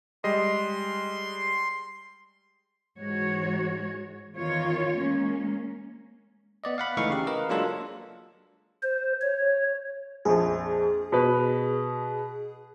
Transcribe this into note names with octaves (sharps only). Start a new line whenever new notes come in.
G3 G#3 D#5 C6
G#2 E3 G#3 F#4 C#5
E2 D#3 F4 C#5
G#3 A#3 C#4
B3 D5 D#5
F5 F#5 B5
C#2 E3 A3 D#4 F5 C#6
C#3 G4
A#4 B4 D#5 F5
F#3 G#3 A#3 D4 F4 A4
C5
C#5
A#1 F2 G#4
B2 B4